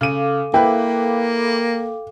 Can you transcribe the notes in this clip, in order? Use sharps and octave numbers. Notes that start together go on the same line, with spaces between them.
C#3 A4 F5 D6 D#7
A#3 E4 B4 G5